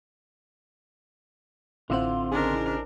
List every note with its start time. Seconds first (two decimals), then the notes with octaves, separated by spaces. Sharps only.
1.90 A1 D3 C4 E4 F4 C5 F#5
2.32 C#3 D4 D#4 G#4 A#4